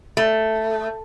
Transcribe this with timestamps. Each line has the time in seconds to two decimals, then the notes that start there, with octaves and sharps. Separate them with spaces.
0.17 A3